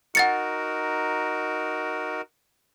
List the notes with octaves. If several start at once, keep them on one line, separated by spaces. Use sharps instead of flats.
D#4 F#4 A#4 F#5 A6 C#7